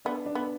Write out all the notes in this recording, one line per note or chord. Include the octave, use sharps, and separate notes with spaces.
B3 D4
D4
B3